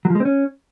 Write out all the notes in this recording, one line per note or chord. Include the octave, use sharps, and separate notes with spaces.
F#3
F3
G#3
C4
C#4